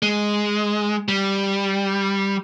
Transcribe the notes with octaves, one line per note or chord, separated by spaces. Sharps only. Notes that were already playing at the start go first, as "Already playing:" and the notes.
G#3
G3